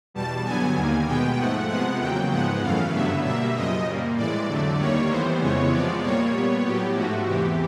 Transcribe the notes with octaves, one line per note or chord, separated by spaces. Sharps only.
E2 B2 G3 A5
G2 D3 F#3 B3 G#5
D#2 D#3 G3 A#3
B2 G#3 B3 G5
G#2 F3 A3 F#5
C3 F3 G#3 B3 F#5
E2 C#3 F#3 A#3 G5
G#2 F3 G#3 B3 F#5
F#2 C#3 E3 A3 F5
G2 D3 F#3 B3 E5
B2 G3 A#3 E5
F#2 C#3 F3 D#5
A#2 G3 A#3
A2 E3 G#3 D5
F2 D3 F#3 A3
D#2 D#3 G3 A#3 C#5
A2 E3 G3 B3 C5
F2 C#3 E3 G#3 B3 C#5
C3 F3 G#3 B3 D5
A#2 G3 A#3 C#5
A#2 G3 B3
A2 F#3 B3 G4
G#2 F3 A3 F#4
E2 C3 E3 G4